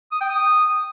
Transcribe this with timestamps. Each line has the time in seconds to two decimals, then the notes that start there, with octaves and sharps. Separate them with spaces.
0.12 D#6
0.21 G5
0.30 D#6